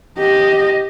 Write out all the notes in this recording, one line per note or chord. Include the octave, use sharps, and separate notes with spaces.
G4 D#5